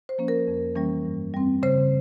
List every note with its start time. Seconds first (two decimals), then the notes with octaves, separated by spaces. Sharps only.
0.09 C5
0.18 F3 A#3 C#4
0.28 A#4
0.48 F2
0.75 E3 G3 A#3 C#4
1.05 G2
1.34 G3 C4
1.63 C#3 C5